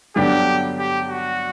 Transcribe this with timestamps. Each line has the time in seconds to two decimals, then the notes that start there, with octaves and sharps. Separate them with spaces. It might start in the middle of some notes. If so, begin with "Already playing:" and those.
0.16 G2 D3 F#3 B3 D4 G4
0.79 G4
1.10 F#4